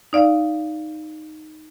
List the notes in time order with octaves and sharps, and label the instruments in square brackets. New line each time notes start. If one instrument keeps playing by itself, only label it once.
[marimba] D#4 D5 F5